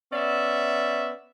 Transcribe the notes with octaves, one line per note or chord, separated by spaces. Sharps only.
B3 C#4 D5 E5